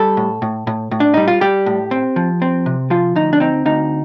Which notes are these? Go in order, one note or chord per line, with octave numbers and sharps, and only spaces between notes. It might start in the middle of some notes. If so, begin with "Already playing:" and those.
Already playing: G3 A4
A2
A2
A2
A2
D4
G3 D#4
F4
G3 G4
A2
C4
F3
C4
C3
F3 F4
D2 D#4
D4
C4 D#4
D2 D#4